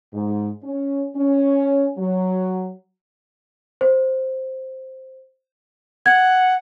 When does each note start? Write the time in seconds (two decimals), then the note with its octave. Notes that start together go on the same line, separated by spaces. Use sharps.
0.13 G#2
0.64 C#4
1.16 C#4
1.98 F#3
3.81 C5
6.06 F#5 G#6